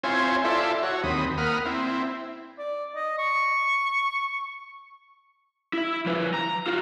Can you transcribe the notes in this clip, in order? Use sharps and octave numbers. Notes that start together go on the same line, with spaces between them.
C4 E4 F4 C5 C#5 G#5
E4 F4 A4 C5 D5 E5
F#4 C#5
D#2 C4 B5 D#6
A#3 F#5 B5 D#6 F6
C4 E4
D5
D#5
C#6
E4 E5
F3 B4
A#5
F4 F#4